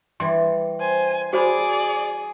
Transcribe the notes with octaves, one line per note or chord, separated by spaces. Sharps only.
E3 G3 C6
C5 G#5
F#4 G#4 C5 D5 B5